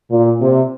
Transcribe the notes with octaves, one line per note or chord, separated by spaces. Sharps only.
A#2
C3